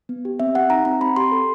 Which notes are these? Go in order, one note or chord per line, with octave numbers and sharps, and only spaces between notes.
B3
G4
C4 E5
G4 F#5
D#4 A#5
C4 A#5
C4 B5
G4 C6
A4